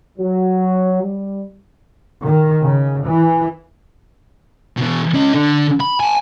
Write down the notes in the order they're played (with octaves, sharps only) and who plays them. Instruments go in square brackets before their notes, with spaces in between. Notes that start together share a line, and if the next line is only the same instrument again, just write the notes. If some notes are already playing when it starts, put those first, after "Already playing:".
[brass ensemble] F#3
G3
[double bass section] D#3
C#3
E3
[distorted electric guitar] B2 E3
C#4 D#5
D3
B5
G#5 A5